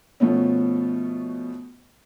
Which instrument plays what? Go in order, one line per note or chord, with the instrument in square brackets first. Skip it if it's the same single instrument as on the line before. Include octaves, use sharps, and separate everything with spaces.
[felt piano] B2 F3 A3 B3 C#4